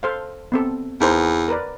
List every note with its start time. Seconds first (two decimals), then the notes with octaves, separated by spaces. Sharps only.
0.03 A4 C5 F5
0.52 B3 C4 A4
1.01 E2 D#4 A#4 C5
1.48 A#4 B4 D5